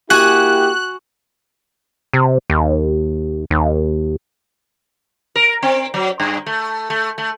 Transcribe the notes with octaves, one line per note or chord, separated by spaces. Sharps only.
A#3 E4 F#4 G4 G#5 F#6
C3
D#2
D#2
A#4
C4
F#3
G2
A3
A3
A3